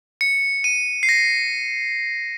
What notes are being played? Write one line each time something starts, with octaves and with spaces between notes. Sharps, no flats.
C#7
D#7
C7
A#6